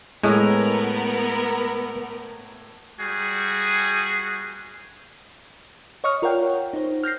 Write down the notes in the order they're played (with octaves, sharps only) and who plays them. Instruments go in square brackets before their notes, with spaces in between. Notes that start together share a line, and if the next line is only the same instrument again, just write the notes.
[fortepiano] A2 [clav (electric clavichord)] G#3 [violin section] B3 A#4
[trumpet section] G3 F#4 G#4
[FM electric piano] C#5 D#5 C#6 D#6 F6
F4 A#4 C#5 D5 F#5 G5
D#4 C5
F6 G6 A#6 C7